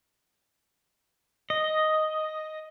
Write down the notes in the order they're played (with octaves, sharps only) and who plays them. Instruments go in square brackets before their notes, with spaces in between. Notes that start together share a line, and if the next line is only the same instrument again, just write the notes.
[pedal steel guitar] D#5